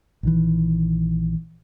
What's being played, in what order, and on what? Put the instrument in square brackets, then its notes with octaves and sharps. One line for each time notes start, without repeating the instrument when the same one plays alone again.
[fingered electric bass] A#1 D#3 E3